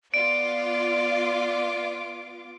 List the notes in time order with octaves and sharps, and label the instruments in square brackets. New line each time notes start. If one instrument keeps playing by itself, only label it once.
[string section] B3 F4 D6 [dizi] D5 [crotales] D7